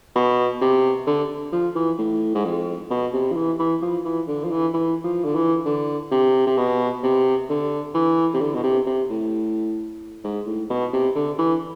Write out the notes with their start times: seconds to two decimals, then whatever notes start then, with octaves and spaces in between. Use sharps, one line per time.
0.15 B2
0.61 C3
1.07 D3
1.52 F3
1.75 E3
1.98 A2
2.35 G#2
2.45 F2
2.90 B2
3.13 C3
3.32 F3
3.36 E3
3.59 E3
3.82 F3
4.05 E3
4.28 D3
4.44 F3
4.51 E3
4.74 E3
5.04 F3
5.24 D3
5.35 E3
5.65 D3
6.11 C3
6.47 C3
6.58 B2
7.03 C3
7.49 D3
7.94 E3
8.34 C3
8.41 D3
8.55 B2
8.64 C3
8.87 C3
9.10 A2
10.24 G#2
10.47 A2
10.70 B2
10.93 C3
11.15 D3
11.39 E3